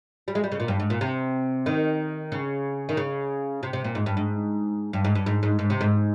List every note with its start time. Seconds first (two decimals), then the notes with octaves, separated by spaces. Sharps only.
0.28 G3
0.35 G#3
0.44 G3
0.52 C#3
0.60 A#2
0.68 G2
0.80 G#2
0.90 A#2
1.01 C3
1.66 D#3
2.32 C#3
2.89 D#3
2.97 C#3
3.63 C3
3.73 C3
3.84 A#2
3.95 G#2
4.06 G2
4.17 G#2
4.93 G2
5.05 G#2
5.15 G2
5.26 G#2
5.43 G#2
5.59 G#2
5.70 C3
5.81 G#2